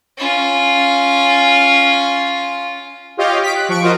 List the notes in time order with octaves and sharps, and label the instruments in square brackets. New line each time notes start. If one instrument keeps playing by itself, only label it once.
[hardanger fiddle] C#4 F4
[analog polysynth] F4 G4 C#5 D#5 F5 G5
B6 D7
F#6
F3 C#6 D7
F4 F#4 A#4 C5 D#5